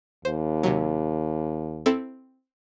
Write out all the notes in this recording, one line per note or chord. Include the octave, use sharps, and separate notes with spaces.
D#2 C5
C3 F#3
C4 E4 A4